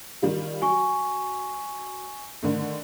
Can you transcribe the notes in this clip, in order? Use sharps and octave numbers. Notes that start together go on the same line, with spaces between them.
D#3 G3 F4
F#3 G#5 C#6
D3 D#3 A3